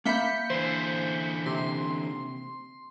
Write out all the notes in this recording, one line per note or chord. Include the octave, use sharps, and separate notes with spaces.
A#3 E5 B5 G6 B6 C#7
D3 E3 C5
C3 C6